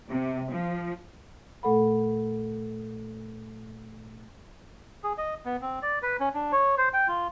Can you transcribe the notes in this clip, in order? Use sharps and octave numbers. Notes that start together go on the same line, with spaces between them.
C3
F3
A#2 A3 A4 F#5 B5
G#4
D#5
B3
C4
D5
B4
C#4
D4
C#5
C5
G5
F4